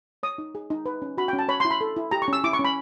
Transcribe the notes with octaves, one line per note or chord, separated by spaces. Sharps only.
C#5 D#6
D#4
G#4
D#4
B4
C#4
F#4 B5
G5
C#4
A5
C#5 B5
C6
E4
B5
A4
E4
G4 A#5
C#6
C#4 E6
E4 D6
C#6
C#4
B5